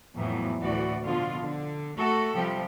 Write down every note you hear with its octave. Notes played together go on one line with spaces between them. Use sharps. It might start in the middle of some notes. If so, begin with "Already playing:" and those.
F2 A2 E3 F#3 B3
D2 A2 E3 F#4 D5
B2 D3 F3 F4
D3
A3 F#4 A4
C3 F3 G3 G4